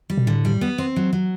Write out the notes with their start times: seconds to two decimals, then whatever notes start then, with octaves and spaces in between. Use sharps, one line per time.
0.10 G3
0.18 B2
0.27 A2 D3
0.45 G3
0.61 B3
0.78 C4
0.96 F#3
1.13 F#3